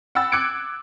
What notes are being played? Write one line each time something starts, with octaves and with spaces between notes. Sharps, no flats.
F#5 G5 B5 E6 A6
D6 F#6 G#6 C#7 D7